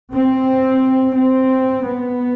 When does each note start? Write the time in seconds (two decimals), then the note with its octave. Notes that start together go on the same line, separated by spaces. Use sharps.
0.14 C4
1.17 C4
1.86 B3